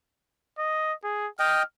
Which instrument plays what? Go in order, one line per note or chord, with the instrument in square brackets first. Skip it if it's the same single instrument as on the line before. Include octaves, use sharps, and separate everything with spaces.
[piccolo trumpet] D#5
G#4
[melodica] D#5 G5 [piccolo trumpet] F6